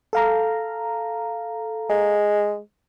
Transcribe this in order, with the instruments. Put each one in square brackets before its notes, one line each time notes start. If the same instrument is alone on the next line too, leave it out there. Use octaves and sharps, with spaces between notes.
[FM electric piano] A4 F5 A#5
[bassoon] G#3